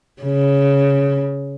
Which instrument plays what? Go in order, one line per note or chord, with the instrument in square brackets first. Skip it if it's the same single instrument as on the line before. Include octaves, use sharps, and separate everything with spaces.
[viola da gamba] C#3